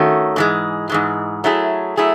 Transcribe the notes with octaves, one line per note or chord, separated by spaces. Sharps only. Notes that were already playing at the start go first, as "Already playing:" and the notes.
Already playing: D#3 A3 C#4 F#4
G#2 E3 G#3
G#2 E3 G#3
F#3 A3 E4 G#4
F#3 A3 E4 G#4